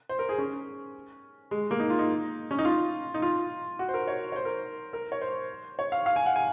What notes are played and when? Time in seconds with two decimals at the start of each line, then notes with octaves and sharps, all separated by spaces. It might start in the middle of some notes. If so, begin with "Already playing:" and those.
0.09 C5
0.19 A#4
0.29 G#4
0.38 C#4
1.51 G#3
1.71 A#3
1.79 D#4
1.90 F4
1.99 D#4
2.51 C#4
2.58 D#4
2.65 F4
3.14 D#4
3.22 F4
3.79 F#4
3.89 C5
3.94 A#4
4.08 C#5
4.32 C#5
4.36 C5
4.45 A#4
4.93 A#4
5.12 C#5
5.21 C5
5.79 C#5
5.92 F5
6.06 F5
6.16 G#5
6.26 F#5
6.36 G#5